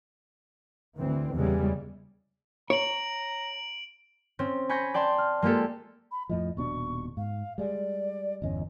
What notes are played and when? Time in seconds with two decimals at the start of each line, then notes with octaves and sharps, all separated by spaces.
0.98 D2 E3 C4
1.34 E2 C#3 E3 G3 G#3
2.70 C#5 A#5 D7 F#7
4.39 C4 C#4
4.69 G#5 B5 C#6 G6 G#6 A#6
4.94 D5 G5 A5 C6
5.18 F6
5.42 G#3 A#3 F4 G4 A4
6.11 B5
6.29 F2 A2 F3 D#5
6.57 D#1 B2 D4 C#6
7.17 G#2 F5
7.58 G3 G#3 D5
8.42 G1 E2 C#4 D#5